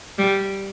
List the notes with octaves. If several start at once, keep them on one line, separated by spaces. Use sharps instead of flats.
G3